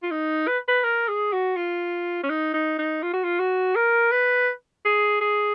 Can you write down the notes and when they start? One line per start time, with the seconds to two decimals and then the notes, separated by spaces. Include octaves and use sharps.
0.03 F4
0.11 D#4
0.47 B4
0.68 B4
0.84 A#4
1.08 G#4
1.33 F#4
1.57 F4
2.23 C#4
2.30 D#4
2.54 D#4
2.79 D#4
3.03 F4
3.13 F#4
3.24 F4
3.40 F#4
3.76 A#4
4.12 B4
4.85 G#4
5.21 G#4